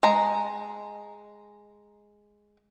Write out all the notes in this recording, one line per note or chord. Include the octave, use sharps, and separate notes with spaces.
G#3 A#5